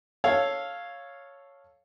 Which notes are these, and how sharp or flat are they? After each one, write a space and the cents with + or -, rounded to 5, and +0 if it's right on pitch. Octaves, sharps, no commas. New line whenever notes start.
A4 +0 C#5 +0 F5 +0